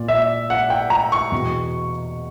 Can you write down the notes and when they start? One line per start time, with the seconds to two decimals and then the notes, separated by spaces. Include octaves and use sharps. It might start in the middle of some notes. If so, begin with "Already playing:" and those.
Already playing: A#2 D5
0.08 E5
0.50 F#5
0.70 G5
0.90 A#5
1.12 C#6
1.32 E2 B2